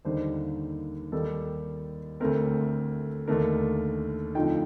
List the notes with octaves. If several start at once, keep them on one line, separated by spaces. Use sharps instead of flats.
D#2 D3 G3 A#3 D#4 C5
D#2 D#3 G3 A4
D2 D3 A3 C4 A#4
D#2 D3 A3 D4 A#4
F2 D3 F3 A3 D#4 G5